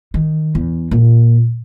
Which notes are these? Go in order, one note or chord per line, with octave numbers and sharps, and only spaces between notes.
D#3
E2
A#2